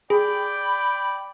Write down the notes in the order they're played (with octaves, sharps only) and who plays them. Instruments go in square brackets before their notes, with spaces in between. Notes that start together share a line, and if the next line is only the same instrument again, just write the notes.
[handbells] G#4 [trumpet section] D5 G5 [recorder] B5